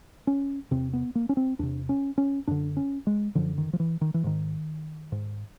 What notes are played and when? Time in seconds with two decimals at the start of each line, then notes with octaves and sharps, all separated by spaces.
0.27 C#4
0.71 E2 C3 C4
0.93 B3
1.15 A#3
1.29 C#4
1.37 C4
1.59 E2 C3 D4
1.89 C#4
2.18 C#4
2.48 F#2 D3 D4
2.77 C#4
3.07 G#3
3.35 F#2 D3 F3
3.58 D#3
3.73 F3
3.80 E3
4.01 D#3
4.14 E3
4.24 G#2 D#3
5.12 G#2